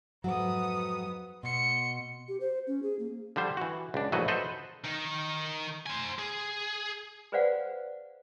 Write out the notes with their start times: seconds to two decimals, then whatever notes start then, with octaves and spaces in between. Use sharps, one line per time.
0.24 F2 G#2 F#3 B3 D#6
1.43 B2 C6 C#7
2.28 G4
2.40 C5
2.67 C#4
2.83 G#4
2.99 A#3
3.36 D3 F3 G3 C5
3.57 E3 F#4
3.94 C#2 D4
4.12 A#1 E3 F#3 A3 F#4 D#5
4.28 A4 B4 C5 D#5 F#5
4.84 D#3 D#4
5.87 C5 G#5
6.19 G#4
7.32 G#4 B4 C5 D5 F5 F#5